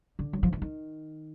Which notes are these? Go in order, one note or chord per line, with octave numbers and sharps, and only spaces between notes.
D3
F#3
F3
E3
D#3